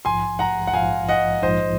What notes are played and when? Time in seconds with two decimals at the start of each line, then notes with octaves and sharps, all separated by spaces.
0.05 A#1 G#2 F3 G#5 C6
0.39 F#5 A#5
0.67 F#5
0.73 A#1 G#2 F3 F5 G#5
1.09 D#5 F#5
1.42 A#1 G#2 F3 C5 D#5